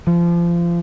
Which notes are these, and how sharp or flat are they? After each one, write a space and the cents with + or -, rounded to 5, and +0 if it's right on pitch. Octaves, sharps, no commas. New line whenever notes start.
F3 -25